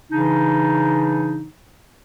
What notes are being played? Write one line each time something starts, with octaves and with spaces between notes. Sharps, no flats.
C#3 E3 D4 D#4